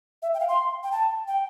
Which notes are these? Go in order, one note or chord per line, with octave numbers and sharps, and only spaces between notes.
E5
G5
F5
C6
G5
A5
G5